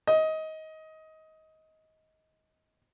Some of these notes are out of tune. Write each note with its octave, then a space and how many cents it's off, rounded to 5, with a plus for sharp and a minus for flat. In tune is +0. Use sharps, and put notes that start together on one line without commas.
D#5 +20